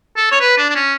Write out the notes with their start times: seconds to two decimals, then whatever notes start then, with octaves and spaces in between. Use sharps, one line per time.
0.17 A4
0.31 C#5
0.41 B4
0.58 D4
0.70 D4
0.75 C#4